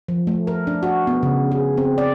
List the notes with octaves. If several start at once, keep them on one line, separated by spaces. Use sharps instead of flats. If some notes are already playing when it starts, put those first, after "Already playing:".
F3
A3
A#4
D4
F#4
B3
C#3
G#4
C4
D5